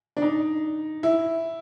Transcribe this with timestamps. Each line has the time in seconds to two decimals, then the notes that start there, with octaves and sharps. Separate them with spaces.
0.17 D4
0.22 D#4
1.03 E4